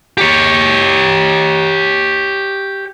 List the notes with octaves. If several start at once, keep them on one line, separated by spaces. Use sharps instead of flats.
G4 C#5